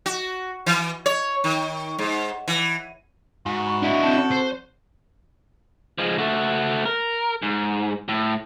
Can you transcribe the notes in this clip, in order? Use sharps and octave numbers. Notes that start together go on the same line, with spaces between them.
F#4
E3
C#5
D#3
G#2
E3
G#2 F#4
B5 C#6
D4 E4
C4 A4 G6
C5
F3 G#3
A3 F#4
A#4
G#2
A2